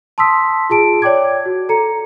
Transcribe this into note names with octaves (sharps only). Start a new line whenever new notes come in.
A5 C6 D#6 E6 B6
F4 G#4 A5 D7
C#5 D5 G5 D6 G#6
F#4
A4 A#5 C#7